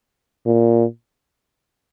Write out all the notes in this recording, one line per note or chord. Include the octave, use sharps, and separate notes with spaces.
A#2